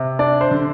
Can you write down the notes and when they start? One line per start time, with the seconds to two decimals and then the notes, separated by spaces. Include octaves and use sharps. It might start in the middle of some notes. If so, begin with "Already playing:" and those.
Already playing: C3
0.19 D4 D5
0.41 C5
0.51 D3